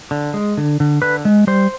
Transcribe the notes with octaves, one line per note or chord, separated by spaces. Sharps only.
D3
G#3
D3
D3
D3 B4
G#3
G3 C5